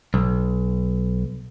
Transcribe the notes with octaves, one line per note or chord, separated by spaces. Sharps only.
B1